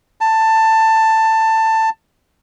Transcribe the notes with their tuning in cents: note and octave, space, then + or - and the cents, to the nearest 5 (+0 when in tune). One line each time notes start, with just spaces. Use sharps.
A5 +15